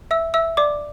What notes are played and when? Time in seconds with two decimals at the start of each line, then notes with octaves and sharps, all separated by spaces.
0.11 E5 E6
0.34 E5 E6
0.57 D5 D6